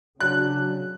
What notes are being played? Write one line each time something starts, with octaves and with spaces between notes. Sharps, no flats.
C#3 F#3 D4 F#6